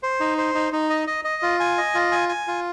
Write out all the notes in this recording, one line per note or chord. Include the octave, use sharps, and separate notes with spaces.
C5
D#4
C5
D#4
D#4
D#5
D#5
D#5
F4
G#5
D#5
F4
G#5
G#5
F4